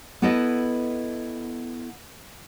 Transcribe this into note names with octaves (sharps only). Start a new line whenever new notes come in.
B3 E4 A4 B4 D#5